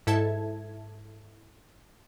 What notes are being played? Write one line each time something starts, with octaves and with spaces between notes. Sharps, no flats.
G#2 E4 A4 E5 A5 G#6